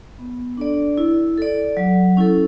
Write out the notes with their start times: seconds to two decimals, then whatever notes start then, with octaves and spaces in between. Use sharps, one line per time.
0.19 B3
0.57 D4 A4 D5
0.98 E4
1.38 A4 D5
1.77 F#3
2.17 C#4 E4 A4